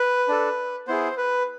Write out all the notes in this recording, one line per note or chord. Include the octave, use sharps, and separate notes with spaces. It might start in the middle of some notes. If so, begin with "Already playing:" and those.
Already playing: B4
D4 A4
B3 E4 G#4 C5
B4